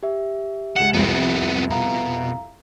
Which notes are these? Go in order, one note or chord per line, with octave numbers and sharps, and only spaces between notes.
G4 E5
C#2 F#5 E7 F#7
C2 F2 B3 C4
B2 F5 A#5